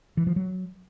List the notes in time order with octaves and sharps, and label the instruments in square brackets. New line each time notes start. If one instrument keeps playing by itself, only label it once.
[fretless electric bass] E3
F3
F#3